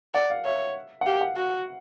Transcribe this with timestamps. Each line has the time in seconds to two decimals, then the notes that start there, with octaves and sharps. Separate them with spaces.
0.14 D5 F#5
0.30 F5
0.45 C#5 E5
1.01 F#5
1.06 G4 F5
1.21 F#5
1.36 F#4